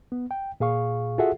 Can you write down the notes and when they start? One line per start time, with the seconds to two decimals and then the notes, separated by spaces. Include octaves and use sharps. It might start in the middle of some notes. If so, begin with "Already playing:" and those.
0.12 B3
0.31 G5
0.60 A#2 G#4 F5 C#6
1.18 F4 F#4 G#4 A4 E5 F#5